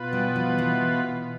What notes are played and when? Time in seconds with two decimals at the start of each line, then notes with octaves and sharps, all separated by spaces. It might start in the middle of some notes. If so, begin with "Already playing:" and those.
Already playing: B2 B3 F4 B4
0.13 G3
0.36 F3
0.58 E3